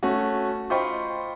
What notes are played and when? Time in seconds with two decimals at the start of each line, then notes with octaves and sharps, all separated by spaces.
0.03 A3 C#4 F#4
0.70 F4 C5 D#5 G5 B5 C#6